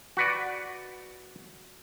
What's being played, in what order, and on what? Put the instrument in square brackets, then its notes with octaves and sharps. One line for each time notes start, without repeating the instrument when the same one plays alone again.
[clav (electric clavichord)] F#4 B4 D5